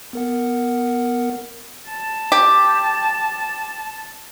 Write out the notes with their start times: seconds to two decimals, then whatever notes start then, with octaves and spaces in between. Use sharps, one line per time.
0.13 B3 A#4 F#5
1.89 A5
2.32 G4